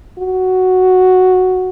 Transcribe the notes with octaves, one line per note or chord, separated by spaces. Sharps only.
F#4